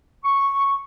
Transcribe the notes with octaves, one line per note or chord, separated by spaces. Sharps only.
C#6